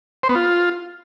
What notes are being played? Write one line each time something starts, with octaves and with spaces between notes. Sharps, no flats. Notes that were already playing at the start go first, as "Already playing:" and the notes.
C5
B3
F4